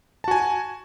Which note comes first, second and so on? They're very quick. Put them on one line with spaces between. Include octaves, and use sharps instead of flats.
A5 F#4 G#5